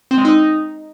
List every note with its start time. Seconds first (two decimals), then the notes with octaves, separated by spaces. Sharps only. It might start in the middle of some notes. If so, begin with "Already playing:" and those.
0.11 C4
0.18 G#3
0.25 D#4